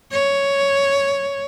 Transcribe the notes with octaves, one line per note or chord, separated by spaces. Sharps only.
C#5